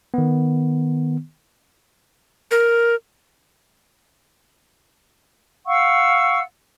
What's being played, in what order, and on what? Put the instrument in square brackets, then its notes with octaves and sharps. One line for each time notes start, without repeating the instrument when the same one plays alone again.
[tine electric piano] D#3 B3
[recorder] A#4
[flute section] F5 F#5 C#6 E6